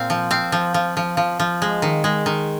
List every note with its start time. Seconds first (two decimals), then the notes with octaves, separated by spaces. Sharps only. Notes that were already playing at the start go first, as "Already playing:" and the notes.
Already playing: A#2 C4 F5
0.10 F3
0.31 C4 F5
0.52 F3
0.74 F3
0.97 F3
1.17 F3
1.40 F3
1.62 G#3
1.82 D#3
2.04 G#3
2.26 D#3